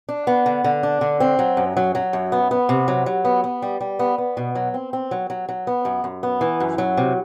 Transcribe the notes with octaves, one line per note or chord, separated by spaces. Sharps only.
D4
B3
D3
D3
D4
D3
C4
F#3
F#2
F#3
F#3
F#2
B3
B3
C3
F#3
F#3
B3
B3
G3
G3
B3
B3
B2
F#3
C4
C4
F#3
F#3
F#3
B3
F#2
F#2
B3
E3
F#2
F#3
C3